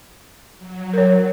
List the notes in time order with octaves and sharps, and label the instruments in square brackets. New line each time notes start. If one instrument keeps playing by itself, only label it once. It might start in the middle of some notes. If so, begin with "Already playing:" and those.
[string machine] F#3
[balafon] A#4 C#5